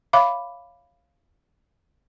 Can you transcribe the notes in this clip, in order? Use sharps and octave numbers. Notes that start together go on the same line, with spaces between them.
C#5 E5 F5 B5 D6